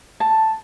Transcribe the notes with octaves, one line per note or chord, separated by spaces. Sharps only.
A5